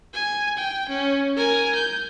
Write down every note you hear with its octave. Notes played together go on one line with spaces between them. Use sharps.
G#5
G5
C#4
A#4 G#5
G6